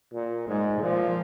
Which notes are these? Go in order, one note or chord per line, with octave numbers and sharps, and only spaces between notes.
A#2
G#2 G#3
A#2 F3